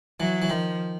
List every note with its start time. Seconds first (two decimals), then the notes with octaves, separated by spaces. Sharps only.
0.20 E3 F#3
0.42 E3
0.50 D#3 F3